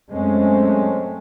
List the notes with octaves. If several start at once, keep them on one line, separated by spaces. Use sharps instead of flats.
F#2 G#3 A3 C4 C#4